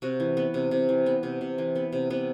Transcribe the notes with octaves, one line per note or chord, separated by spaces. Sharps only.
C3 F#4
E3
B3
C3
C3
E3
B3
C3
C3
E3
B3
C3
C3 B3